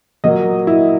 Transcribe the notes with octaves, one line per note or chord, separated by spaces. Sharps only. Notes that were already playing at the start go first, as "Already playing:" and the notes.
A#2 F#3 A#3 D#5
E4